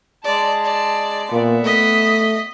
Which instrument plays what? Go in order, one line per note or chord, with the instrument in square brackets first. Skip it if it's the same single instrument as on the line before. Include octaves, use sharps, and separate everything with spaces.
[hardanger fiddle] G#3 A5 [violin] D5
[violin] D5
[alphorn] A#2 [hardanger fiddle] B3 E5
[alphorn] A3 [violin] D#5 B6